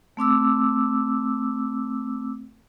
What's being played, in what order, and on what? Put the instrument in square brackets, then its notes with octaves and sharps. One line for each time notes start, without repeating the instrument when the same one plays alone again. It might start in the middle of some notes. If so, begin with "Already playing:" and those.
[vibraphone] A3 C4 D6 E6